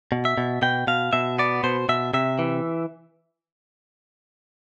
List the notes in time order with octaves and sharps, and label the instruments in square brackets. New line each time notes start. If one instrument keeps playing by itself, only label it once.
[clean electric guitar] B2
E5
B2
B2 G5
B2 F5
B2 E5
B3 D5
B2 C5
B2 E5
C3 E5
E3